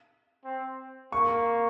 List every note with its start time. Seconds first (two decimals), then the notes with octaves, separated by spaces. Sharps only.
0.45 C4
1.12 A#3 C#6